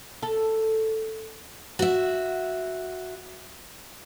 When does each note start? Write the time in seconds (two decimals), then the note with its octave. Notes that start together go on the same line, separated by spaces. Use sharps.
0.22 A4
1.79 F#4 E5